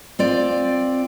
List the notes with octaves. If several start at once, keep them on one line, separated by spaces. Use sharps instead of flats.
C4 F4 D5